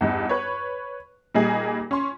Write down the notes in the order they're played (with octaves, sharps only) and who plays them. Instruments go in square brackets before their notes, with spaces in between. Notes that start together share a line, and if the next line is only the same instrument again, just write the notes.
[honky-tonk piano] E2 G2 D#4
B4 C#5
A#2 G3 D#4 G#4
C#4 C6